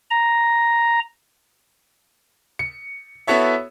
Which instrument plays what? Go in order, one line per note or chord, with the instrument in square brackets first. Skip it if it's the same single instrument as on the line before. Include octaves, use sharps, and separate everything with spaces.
[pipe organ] A#5
[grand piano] C#7
B3 E4 F#4 A4 C#5 E5